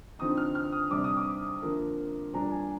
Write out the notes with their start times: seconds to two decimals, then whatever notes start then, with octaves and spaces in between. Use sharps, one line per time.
0.19 D3 F3 C4 D#4 D#6
0.37 F6
0.55 F6
0.72 D#6
0.91 C3 G3 D4 D6
1.04 D#6
1.17 D6
1.62 D3 F3 A#3
2.34 A#2 G3 D4 A#5
2.52 G#5